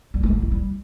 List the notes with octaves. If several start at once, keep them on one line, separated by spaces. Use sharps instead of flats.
G3
G#3
D3
E4
G3